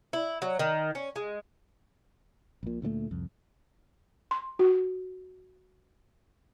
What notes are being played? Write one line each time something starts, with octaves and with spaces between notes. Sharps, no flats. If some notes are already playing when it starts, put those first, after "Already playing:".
E4
F#3
D#3
C#4
G#3
A#1 A#2
D2 A#2 E3 A3
C2 F2
C6
F#4